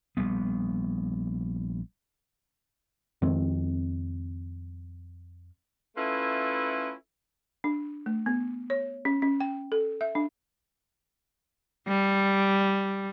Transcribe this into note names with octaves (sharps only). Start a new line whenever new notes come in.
A#1 G3 B3
F2 D#3 G#3 C4
A3 C#4 E4 F4 A4 B4
D4
A3
B3
C#5
C#4
C#4
G5
A4
E5
D4
G3